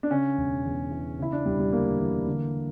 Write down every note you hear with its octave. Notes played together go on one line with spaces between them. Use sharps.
D4
C#3 C#4
E1
E2
E3
C#3 E4
D4
E1 G3
G3
D2 A#3
E3
D3